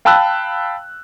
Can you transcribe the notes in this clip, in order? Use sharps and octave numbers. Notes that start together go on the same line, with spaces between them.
F5 G5 A5 B5 E6 F#6